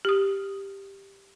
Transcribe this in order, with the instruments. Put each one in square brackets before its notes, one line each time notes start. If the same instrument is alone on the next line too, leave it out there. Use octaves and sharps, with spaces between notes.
[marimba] G4 D#6